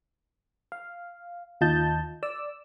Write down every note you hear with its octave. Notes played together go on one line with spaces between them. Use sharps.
F5
D#2 F4 D#5 A5 G6
D5 E6